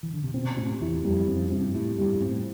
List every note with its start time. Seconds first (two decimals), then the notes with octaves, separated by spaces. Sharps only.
0.03 E3
0.13 D3
0.24 C3
0.34 B2 C4
0.57 A2 C3
0.81 E2 E4
1.04 F2 G3
1.27 F2 C4
1.51 G2 C3
1.74 A2 E4
1.98 G2 G3
2.15 G2
2.22 A2 C4